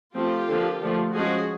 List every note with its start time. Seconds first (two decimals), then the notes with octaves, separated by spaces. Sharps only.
0.15 F3 A3 C4 F4 G4
0.49 D3 F3 A#3
0.82 D3 F3 A3
1.15 F3 G#3 C#4 F#4 G#4